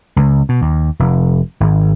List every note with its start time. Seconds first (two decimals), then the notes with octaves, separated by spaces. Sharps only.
0.16 C#2
0.49 B2
0.62 D#2
0.99 F1
1.60 G#1